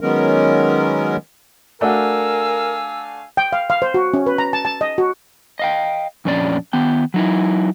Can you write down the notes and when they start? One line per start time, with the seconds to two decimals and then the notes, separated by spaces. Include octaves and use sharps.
0.01 D#3 F#3 G#3 B3 C#4 A#4
1.81 A3 D4 F#4 A#4 F5 G#5 E6
3.37 G5
3.53 F5
3.70 F5
3.82 C5
3.94 F#4
4.14 C#4
4.26 B4
4.38 A#5
4.53 A5
4.65 A5
4.81 D#5
4.98 F#4
5.59 D#5 F5 G5
6.25 F2 A#2 C#4 D4 F#4 D5
6.73 D#3 B3 G5
7.14 F#3 D#4 E4